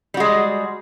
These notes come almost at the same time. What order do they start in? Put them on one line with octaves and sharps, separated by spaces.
G3 F#4 G#3